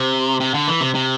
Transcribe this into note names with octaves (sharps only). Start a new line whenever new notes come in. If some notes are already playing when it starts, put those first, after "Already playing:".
Already playing: C3
C3
D3
E3
C3
C3